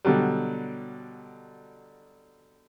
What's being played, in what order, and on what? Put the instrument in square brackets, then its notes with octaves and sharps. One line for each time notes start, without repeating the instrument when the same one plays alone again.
[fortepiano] B2 D3 F#3 G3